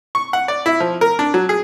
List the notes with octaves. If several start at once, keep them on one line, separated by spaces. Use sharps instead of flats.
C#6
F#5
D5
E4
F3
A#4
D4
F#3
G#4